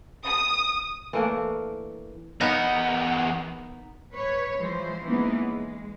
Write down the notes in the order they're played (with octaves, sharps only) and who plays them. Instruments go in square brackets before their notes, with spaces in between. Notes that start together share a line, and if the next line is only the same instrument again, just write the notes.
[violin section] D#6
[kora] E3 A3 A#3 D4
[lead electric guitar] E2 F#5 [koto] B3 D#4 A#4
[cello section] B4 C#5
E3 F3 G#3 C5
E3 G#3 A#3 B3 C#4 D#4
G#3